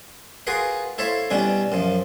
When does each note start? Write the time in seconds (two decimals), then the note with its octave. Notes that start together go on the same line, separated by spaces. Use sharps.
0.47 F4 F#4 G#4 A#4 B4 F5
0.98 E4 A4 C5 C#5 E5 F5
1.30 B2 G3 C#4 D4 E4
1.72 F#2 F3